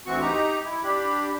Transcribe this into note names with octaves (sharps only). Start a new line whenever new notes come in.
D2 E3 C4 F#4 C#6
D#4 G4 A#5
E4
D4 G4 B5